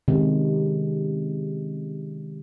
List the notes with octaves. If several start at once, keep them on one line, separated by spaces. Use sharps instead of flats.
C3 D#3 G#3 C#4